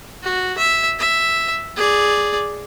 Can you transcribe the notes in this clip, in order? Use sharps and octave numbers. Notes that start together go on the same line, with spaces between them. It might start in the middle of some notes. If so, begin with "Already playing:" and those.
F#4
E5
E5
G#4 D5